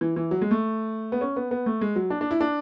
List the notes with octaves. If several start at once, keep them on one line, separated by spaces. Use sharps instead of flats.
E3
E3
F#3
G#3
A3
B3
C#4
B3
B3
A3
G#3
F#3
D4
D4
E4
D4